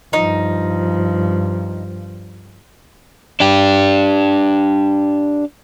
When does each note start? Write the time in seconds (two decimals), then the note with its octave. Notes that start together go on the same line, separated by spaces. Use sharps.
0.13 G2 F3 D#4
3.40 D4 G4